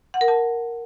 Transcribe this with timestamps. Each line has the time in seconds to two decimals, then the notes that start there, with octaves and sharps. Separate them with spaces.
0.14 F#5
0.21 A#4
0.28 A5